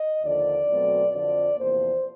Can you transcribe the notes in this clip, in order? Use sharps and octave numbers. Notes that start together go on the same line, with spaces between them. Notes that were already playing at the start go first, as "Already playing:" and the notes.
Already playing: D#5
D#2 D3 F3 D5
B2 F#3 A3 C4
F2 D3 F3 A3 D5
E2 C3 F3 A#3 C5